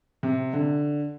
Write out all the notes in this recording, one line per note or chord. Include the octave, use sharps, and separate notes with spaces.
C3
D3